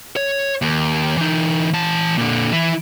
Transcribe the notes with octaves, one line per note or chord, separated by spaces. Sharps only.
C#5
D#2
E3 D#4
E3 A5
A#2 D3
E3 E4